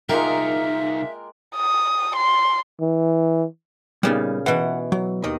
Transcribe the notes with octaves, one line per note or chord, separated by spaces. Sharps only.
C2 G#3 A#3 D#4 F4 A#4 E5 G5
D#6
C6
E3
A#2 C#3 G3 B3 D#4
B2 E3 F#5
F#3
D#2 D#3 D#5